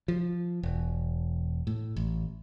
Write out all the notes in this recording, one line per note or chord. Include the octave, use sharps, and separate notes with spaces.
F3
E1
A2
A1